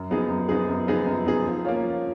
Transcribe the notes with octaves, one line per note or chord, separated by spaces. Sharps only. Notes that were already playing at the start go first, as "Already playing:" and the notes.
Already playing: F#2
F3 B3 D#4 G#4
F#2
F3 B3 D#4 G#4
F#2
F3 B3 D#4 G#4
F#2
F3 B3 D#4 G#4
F3
A#3 C#4 F4
F3